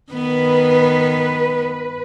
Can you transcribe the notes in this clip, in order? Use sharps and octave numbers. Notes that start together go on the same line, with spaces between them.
D#3 B3 B4